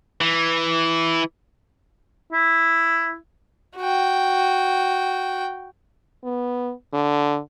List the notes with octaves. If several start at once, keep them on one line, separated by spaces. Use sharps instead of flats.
E3
E4
F#4 G5
B3
D3